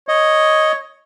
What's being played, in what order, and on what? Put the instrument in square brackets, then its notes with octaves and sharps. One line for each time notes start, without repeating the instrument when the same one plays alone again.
[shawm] C#5 [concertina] D#5